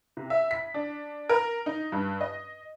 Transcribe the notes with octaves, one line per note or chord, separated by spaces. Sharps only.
C3
E5
B6
D4
A#4
D#4
G2
D#5